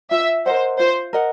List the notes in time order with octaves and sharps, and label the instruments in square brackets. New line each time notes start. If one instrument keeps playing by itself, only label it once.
[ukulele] F4 [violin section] E5
[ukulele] A#4 D#5 F#5 [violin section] C5
[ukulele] F4 [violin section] C5
[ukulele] A#4 D#5 F#5